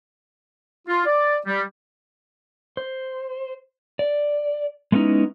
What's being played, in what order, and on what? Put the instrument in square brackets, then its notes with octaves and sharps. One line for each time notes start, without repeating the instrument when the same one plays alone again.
[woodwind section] F4
D5
G3
[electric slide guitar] C5
D5
G#3 A3 B3 C#4 D#4 E4